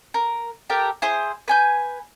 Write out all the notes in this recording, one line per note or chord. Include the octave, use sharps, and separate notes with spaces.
A#4
G4 A4 A#4 G5
E4 G#4 C5
B4 G#5 G6